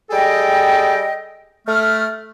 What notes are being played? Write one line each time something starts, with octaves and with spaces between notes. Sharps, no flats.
G3 G#4 A4 D#5 G5
A3 F6